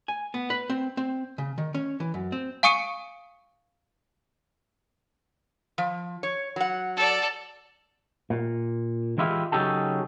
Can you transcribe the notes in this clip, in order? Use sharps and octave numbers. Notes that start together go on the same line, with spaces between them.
G#5
B3
B4
C4
C4
C#3
D#3
C#4
E3
F#2
C4
F5 G#5 C#6 D#6 C#7 D#7
F3
C#5
F#3 F#5
A4 D5
A#2
E3 G#3 E4 F4 G4
C#3 F#3 C#4 D#4 G4 A4